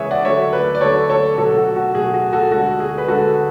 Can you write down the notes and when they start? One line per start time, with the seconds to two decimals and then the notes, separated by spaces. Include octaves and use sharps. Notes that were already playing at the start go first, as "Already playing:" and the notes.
Already playing: C#3 E3 G#3 G#4 B4 C#5 E5
0.11 D5 F#5
0.25 D3 F#3 A3 C#5 E5
0.53 B4 D5
0.75 D5
0.81 D3 F#3 A3 A4 C#5
1.10 A4 C#5
1.38 B2 F#3 A3 F#4 A4
1.57 F#4
1.76 F#4
1.95 B2 F#3 A3 G#4
2.14 F#4
2.33 F#4 A4
2.51 D3 G#3 F#4
2.80 G#4
2.98 B4
3.08 D3 G#3 F#4 A4